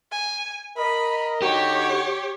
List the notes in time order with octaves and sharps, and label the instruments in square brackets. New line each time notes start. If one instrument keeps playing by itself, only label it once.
[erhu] G#5
[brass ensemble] A#4 D#5 [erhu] B5
[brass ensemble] D3 D#4 F#4 [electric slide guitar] G4 [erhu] C#5